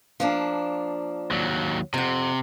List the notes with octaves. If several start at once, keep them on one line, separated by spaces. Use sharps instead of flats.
F3 A#3 D4
D#2 F#3
F2 C3 F#5